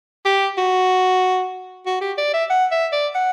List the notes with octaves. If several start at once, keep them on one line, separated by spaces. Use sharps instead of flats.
G4
F#4
F#4
G4
D5
E5
F#5
E5
D5
F#5